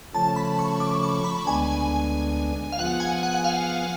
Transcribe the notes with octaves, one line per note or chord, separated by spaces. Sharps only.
C#3 F3 A3 C#4 A5
B5
C#6
D6
C#6
B5
D2 D3 G#3 B3 D4 G#5
F5
F3 B3 F4 G#4 F#5
G#5
F#5
F#5
F5